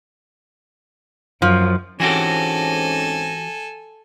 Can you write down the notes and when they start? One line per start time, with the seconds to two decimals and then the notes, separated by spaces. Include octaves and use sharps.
1.42 F#2 F3
2.00 G#2 E3 C4 C#4 F#4 G4 A4 G#5